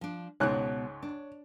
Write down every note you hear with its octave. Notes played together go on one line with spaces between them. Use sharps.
F3 D4
C#2 G#2 B2 G#3 C#5 F#6
D4